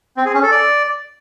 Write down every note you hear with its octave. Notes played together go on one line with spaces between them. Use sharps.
C4
G#4
C#4
A4
D5